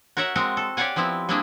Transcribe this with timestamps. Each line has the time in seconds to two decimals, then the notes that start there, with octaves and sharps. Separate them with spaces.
0.17 F#4 A#4 C#5 E5 F#5
0.35 G#3 C4 F#4 A#4
0.57 A4
0.77 G4 C#5 D5 F5 F#5 G#5
0.96 F3 B3 C4 E4
1.29 G3 A#3 C4 D4 E4 G#4